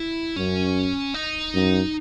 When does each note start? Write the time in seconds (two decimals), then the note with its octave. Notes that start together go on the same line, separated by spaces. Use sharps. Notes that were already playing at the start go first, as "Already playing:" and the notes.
Already playing: E4
0.36 F#2 C#4
1.14 D#4
1.54 F#2